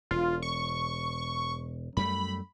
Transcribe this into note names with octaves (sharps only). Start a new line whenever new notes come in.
E1 F4
C#6
F#2 G3 A3 B5